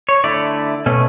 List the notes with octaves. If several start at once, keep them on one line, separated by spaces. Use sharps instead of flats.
C#5
D3 A3 E4 D5
B2 A3 C#4